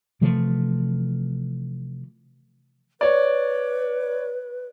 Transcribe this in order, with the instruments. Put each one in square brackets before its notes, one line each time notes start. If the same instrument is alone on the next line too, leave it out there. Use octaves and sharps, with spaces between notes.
[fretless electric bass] C3 E3 F3 A3
[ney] B4 [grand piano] C#5 D5